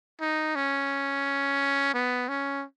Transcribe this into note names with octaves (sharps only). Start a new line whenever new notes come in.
D#4
C#4
B3
C#4